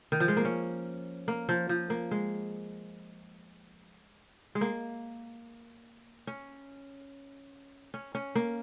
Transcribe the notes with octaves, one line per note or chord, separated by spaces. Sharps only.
D#3
F3
G#3
A#3
C#4
A#3
F3
F3
A#3
G#3
G#3
A#3
C#4
C#4
C#4
A#3